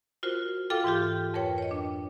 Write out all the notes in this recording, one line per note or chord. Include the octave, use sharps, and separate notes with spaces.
F4 F#4 A#4 C5
F4 A4 F5 G5 D6
G#2 E3 F4 G4
F2 A#4 B4 C#5 G5
C#5 D#5
D4